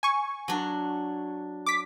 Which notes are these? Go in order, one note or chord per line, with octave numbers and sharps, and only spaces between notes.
G#5 C#6
F#3 D4
D6 B6